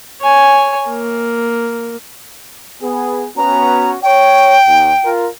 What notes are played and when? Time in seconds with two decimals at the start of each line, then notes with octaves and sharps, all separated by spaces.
0.22 C#5 G#5
0.88 A#3
2.82 B3 G#4
3.37 B3 C#4 F#4 A#5
4.03 C#5 G5
4.67 D#2
5.05 F4 A#4